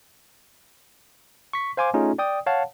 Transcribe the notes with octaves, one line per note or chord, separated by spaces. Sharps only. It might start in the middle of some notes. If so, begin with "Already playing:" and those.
C#6 B6
C5 F5 G#5 C6 D6
A3 C#4 D#4 F4 G#4
D5 G5 D#6
C#5 F5 F#5 A5